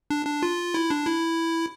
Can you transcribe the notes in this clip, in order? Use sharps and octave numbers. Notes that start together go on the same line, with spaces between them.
D4
D4
F4
E4
D4
E4